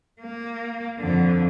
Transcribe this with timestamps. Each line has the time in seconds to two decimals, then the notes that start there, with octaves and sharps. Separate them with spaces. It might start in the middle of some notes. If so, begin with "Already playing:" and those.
0.21 A#3
1.00 F2 D3